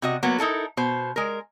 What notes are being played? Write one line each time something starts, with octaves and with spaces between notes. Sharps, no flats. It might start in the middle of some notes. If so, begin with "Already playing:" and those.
C3 F#4 D#5
F#3 A#3 B3
D#4 E4 A4 A#4
B2 C5
G#3 A#4